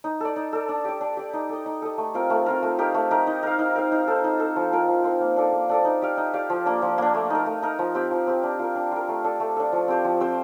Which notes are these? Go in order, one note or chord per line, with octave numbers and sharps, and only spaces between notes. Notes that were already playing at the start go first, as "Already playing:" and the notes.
D#4
A4 D5
D#4
A4 D5
D4
G4 D5
D4
G4 D5
D#4
A4 D#5
D#4
A4 D#5
A3
C4 F4 A#4
A3
C4 F4 A#4
A3
D#4 G4 A#4
A3
D#4 G4 A#4
D#4
A#4 F5
D#4
A#4 F5
D#4
A4 C5
D#4
A4 C5
F3
C4 F4 A#4
F3
C4 F4 A#4
A#3
D4 A4 D5
A#3
D4 A4 D5
D#4
G4 D5 F5
D#4
G4 D5 F5
F3
A#3 D4
F3
A#3 D4
A3
D#4 A#4
A3
D#4 A#4
F3
C4 G4
F3
C4 G4
D4
F4 A#4
D4
F4 A#4
A3
D4 A4
A3
D4 A4
F3
C4 G4 C5
F3
C4 G4 C5